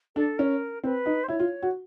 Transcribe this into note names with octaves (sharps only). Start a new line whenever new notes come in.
D4 A4
C#4 A#4
C4 B4
D#4
C5
E4 C#5
F4
F#4